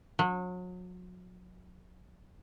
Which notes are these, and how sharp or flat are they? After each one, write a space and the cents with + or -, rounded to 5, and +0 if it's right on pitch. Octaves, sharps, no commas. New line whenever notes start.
F#3 -35